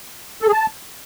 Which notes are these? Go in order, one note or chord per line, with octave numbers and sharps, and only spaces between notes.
A4
G#4
A5